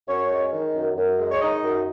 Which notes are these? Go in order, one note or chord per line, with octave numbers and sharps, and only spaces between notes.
F#2 C#4 C#5
G#3
D#3
F#2
F#2
G#3
C#5
D#3 D#4 D#5
F#2